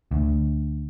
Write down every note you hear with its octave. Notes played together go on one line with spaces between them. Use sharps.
D2